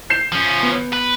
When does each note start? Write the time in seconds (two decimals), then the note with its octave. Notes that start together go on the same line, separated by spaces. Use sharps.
0.10 G6 C7 E7
0.32 F3 C#4
0.63 B3
0.93 B4